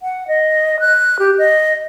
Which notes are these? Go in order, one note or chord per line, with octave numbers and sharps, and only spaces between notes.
F#5
D#5
F#6
G4
D#5